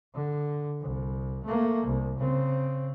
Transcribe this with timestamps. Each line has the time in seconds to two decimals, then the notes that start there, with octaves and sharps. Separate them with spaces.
0.14 D3
0.81 C2
1.45 A3 A#3
1.86 C2
2.18 C#3 C4